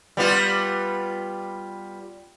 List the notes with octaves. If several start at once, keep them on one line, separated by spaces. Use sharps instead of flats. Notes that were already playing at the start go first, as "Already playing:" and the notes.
G3 B3 F4